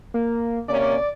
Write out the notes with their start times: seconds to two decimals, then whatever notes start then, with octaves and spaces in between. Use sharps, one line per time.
0.14 A#3
0.68 C3 A#3 C#4 D5